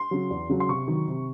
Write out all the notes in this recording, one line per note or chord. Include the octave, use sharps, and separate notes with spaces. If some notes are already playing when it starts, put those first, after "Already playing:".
Already playing: C6
C#3 F#3
E2
C#3 F#3
C6
C3 C#6
D#3 F#3
C3